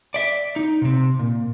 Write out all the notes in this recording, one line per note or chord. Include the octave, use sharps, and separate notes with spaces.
D5 E5
D#4
C3 C4
A#2